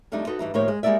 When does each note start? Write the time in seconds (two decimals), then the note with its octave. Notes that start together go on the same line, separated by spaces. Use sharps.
0.12 F2 G3 A3 D4 D#4
0.27 D#4 F#4 A4 B4
0.39 G2 E3 D#4
0.54 A2 D#3 F3 A#3 G4 C#5
0.68 G#3
0.83 G3 G#3 A#3 E4 D5 E5